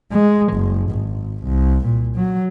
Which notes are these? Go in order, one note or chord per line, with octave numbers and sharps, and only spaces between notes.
G#3
F#1
G#1
C2
A#2
F#3